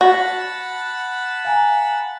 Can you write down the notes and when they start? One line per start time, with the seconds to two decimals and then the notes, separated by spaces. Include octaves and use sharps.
0.01 F#4 F#5 A5 B5 A#6
1.45 F5 G#5 A#5